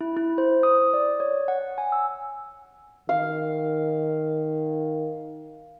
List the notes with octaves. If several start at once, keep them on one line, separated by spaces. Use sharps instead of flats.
E4
E4
C5
D#6
D5
C#5
F#5
G#5
E6
D#3 F5